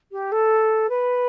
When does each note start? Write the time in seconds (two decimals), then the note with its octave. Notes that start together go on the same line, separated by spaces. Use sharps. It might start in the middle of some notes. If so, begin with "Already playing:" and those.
0.11 G4
0.31 A4
0.89 B4